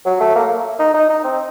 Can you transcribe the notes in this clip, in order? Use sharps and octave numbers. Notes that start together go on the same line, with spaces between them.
F#3
A3
A#3
D#4
D#4
D#4
C4